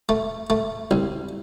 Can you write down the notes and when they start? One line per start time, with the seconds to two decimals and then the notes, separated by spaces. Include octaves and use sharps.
0.09 A3
0.50 A3
0.91 C2